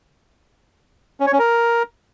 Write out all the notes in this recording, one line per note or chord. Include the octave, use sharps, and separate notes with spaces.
C#4
C#5
C#4
A#4